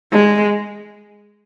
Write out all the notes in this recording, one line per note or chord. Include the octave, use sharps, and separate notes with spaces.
G#3